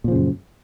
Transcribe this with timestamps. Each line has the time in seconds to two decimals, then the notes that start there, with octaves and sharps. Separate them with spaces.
0.04 A#2
0.08 F3
0.12 C#3
0.15 F#2